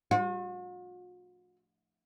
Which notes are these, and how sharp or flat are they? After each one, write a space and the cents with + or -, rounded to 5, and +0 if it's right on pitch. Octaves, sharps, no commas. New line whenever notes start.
F#4 -45